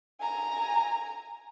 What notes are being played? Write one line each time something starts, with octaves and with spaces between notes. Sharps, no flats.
G#5 A#5